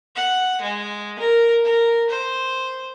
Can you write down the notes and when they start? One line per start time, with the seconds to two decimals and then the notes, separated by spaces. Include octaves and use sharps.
0.16 F#5
0.62 G#3
1.19 A#4
1.64 A#4
2.10 C5